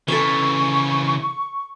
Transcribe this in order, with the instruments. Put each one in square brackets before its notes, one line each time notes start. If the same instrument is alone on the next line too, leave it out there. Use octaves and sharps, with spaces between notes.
[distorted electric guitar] C#3 E3 [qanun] A4 E5 [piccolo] C#6